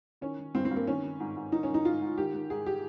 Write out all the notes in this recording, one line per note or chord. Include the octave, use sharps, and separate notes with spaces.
D#3 C#4
D#3
G2 C4
C4
G2
A#3
D#3 C#4
D#3
G#2
G#2
D#3 D#4
C#4
D#3
D#4
G#2 F4
G#2
D#3 G4
D#3
G#2 G#4
G4